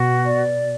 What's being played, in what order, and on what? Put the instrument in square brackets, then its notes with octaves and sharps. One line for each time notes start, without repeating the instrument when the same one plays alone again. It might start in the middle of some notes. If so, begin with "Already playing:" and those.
Already playing: [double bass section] B2 [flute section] F#4
[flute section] D5